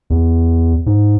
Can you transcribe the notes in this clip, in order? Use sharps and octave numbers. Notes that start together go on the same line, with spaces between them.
E2
G#2